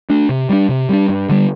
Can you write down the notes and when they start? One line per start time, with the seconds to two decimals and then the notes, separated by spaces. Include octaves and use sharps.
0.10 A3 D4
0.29 C3
0.49 G3 D4
0.69 C3
0.89 G3 D4
1.09 G2
1.29 D3 G3